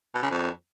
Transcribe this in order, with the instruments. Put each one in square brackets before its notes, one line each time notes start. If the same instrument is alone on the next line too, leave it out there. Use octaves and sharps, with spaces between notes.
[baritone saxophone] B2
C#3
F2